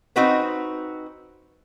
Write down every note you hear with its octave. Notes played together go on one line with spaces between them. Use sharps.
C4 D#4 F#4 B4 C5